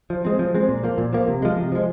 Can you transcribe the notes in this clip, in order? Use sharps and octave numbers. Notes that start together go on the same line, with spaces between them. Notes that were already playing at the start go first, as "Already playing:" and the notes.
F3
G#3 C4
F3
G#3 C4
A#2
F3 A#3
A#2
F3 A#3
C3
F3 G#3
C3
F3 G#3